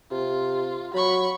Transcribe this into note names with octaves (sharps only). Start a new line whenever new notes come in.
C3 F4
F#3 B5 C#6